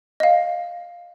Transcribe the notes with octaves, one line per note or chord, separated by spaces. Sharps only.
D#5 F5